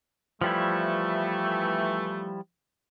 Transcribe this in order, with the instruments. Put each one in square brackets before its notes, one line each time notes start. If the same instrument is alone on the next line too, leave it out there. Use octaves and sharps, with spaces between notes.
[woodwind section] E3 A3 [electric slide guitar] F3 G3 E4